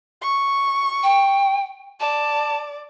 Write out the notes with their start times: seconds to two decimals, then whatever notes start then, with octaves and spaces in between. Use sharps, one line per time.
0.22 C#6
1.03 G5
2.00 D5 A5